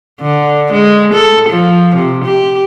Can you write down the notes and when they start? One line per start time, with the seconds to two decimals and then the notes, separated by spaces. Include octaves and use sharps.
0.21 D3
0.73 G#3
1.13 A4
1.49 F3
1.96 C3
2.25 G4